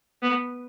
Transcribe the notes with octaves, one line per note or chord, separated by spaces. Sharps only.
B3